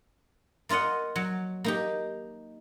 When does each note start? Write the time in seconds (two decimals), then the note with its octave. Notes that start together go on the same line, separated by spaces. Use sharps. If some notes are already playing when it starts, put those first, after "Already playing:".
0.69 A#3 F4 A#4 D#5 F#5
1.16 F#3
1.64 A#3 D#4 G4